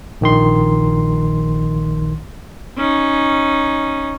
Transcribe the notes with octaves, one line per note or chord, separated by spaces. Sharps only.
A#1 D#3 C6
C#4 D#4